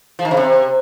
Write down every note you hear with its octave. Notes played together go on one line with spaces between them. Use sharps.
F3
D#3
C#3
C3